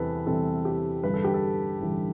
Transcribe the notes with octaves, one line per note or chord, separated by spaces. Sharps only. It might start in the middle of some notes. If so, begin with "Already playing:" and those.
Already playing: E2 C3 G3 C4 A4 B4
E2 C3 G3 C4 A4
G4
A1 G2 D3 B4
A4
G4
A4
A1 G2 D3